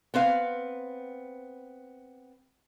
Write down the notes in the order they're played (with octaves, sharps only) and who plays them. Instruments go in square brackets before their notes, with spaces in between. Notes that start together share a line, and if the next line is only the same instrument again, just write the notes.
[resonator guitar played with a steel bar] B3 C4 B4 F5